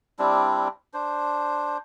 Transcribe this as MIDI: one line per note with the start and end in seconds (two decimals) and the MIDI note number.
0.19 0.68 55
0.19 0.68 60
0.19 0.68 62
0.19 0.68 64
0.94 1.78 62
0.94 1.78 72